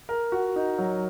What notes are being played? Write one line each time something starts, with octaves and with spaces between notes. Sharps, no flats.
A#4
F#4
D#4
F#3